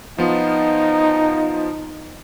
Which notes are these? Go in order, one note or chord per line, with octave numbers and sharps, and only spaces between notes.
F3 B3 D#4 F4